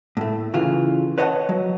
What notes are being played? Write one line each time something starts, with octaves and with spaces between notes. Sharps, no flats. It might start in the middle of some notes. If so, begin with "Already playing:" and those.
A2 A3
C#3 E3 F4
B4 C#5 D#5 F#5 A5
F#3